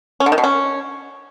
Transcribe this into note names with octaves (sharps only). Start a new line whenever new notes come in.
C#4
D3
D#3
B2
C#4